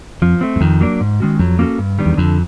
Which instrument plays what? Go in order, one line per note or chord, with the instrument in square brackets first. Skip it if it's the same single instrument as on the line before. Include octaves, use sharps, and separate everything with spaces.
[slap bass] F2 [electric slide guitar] F3
[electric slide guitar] A3 C4
[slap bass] F#2
[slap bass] F2 [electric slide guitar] D#3
[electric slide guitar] F#3 A#3 D4
G#2
D#3 G#3 C#4 F#4
[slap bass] F2 [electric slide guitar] F#3
[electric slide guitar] A#3 C#4 F#4 A4
G2
D#3 G3 B3 D4
[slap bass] E2
[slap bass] F2 [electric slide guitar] D3